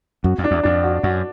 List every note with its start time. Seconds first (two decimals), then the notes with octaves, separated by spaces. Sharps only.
0.24 F#2 F#4
0.38 F2
0.44 D4
0.51 E2
0.63 F2 D4
0.83 F#4
1.03 F#2 F#4